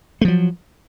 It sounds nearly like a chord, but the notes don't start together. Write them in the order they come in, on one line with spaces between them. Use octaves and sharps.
A3 F3 F#3